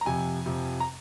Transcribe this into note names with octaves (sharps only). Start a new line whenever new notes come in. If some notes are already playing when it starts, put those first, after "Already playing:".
A#5
F2 C3 F3 G#5
F2 C3 F3
A#5